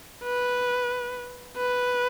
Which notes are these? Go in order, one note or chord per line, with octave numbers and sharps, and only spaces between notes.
B4
B4